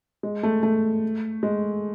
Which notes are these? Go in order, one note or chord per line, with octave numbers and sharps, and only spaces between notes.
G#3
A3
A3
G#3